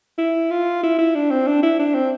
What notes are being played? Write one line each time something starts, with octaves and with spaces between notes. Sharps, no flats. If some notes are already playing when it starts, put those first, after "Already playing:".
E4
F4
E4
E4
D4
C4
D4
E4
D4
C4